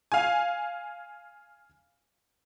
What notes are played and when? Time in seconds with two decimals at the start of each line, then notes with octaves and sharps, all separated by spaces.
0.12 F5 G#5